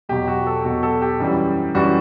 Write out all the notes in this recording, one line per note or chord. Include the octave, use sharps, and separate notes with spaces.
E2 B2 F#3 G4
F#4
A4
E2 B2 F#3 F#4
A4
G4
F#2 E3 G3
F#2 E3 G3 F#4